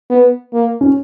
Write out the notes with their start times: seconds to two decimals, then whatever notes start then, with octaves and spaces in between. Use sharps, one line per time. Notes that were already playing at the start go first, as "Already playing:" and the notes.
0.10 B3
0.53 A#3
0.81 C#4